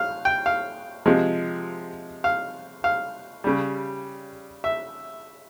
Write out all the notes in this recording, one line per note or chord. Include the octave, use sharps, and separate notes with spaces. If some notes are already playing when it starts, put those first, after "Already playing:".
Already playing: F5
G5
F5
C3 F3 G#3
F5
F5
C#3 G3
E5